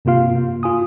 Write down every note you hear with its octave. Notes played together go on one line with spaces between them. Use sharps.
G2 C3 A#3 F4 F5
A#3
F4 G#5 D#6